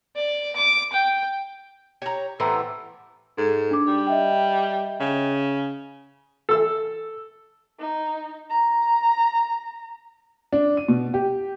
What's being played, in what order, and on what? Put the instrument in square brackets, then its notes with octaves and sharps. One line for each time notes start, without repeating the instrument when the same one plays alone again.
[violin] D5
D6
G5
[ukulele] G4 [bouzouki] C#5 A#5
[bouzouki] A2 E3 B3 [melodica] G4 A4 C5 [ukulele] B4 A#5
[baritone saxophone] G#2 [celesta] A4
[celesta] D4 D6
[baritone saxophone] G3
[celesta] D#5 E5 G5
[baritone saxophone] C#3
[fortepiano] A4 E6
[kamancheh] D#4
A#5
[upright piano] D4
D#7
B2
G4